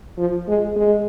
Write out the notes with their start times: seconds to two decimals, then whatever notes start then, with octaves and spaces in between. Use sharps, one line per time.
0.18 F3
0.48 G#3
0.76 G#3